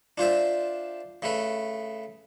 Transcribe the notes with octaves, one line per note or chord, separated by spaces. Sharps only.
D4 F4 C5 E5
C#3 A3 B4